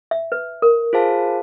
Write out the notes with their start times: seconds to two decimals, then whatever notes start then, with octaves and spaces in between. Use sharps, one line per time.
0.11 E5
0.32 B4
0.62 A#4
0.93 F4 G#4 C5 F5 A5